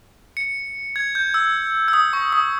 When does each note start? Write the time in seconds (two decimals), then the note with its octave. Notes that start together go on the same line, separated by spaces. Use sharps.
0.37 C#7
0.96 G#6
1.15 G6
1.34 E6
1.88 E6
1.93 D#6
2.13 C#6
2.33 D#6